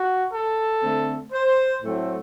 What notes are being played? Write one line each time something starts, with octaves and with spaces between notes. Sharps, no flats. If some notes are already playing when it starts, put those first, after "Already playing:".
Already playing: F#4
A4
D3 A3 C4
C5
A2 F#3 A3 C4